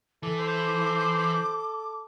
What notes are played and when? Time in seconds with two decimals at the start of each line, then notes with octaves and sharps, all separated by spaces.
0.23 E3 A4 D6
0.38 C5